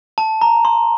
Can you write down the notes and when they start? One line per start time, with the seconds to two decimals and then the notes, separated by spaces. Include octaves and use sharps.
0.18 A5
0.41 A#5
0.65 C6